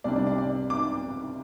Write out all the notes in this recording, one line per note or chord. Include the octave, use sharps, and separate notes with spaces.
C2 C3 G3 D4 D5
D5
D5
D5
D6